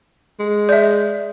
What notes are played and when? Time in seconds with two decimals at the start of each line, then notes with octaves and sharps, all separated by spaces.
0.40 G#3
0.69 D5 E5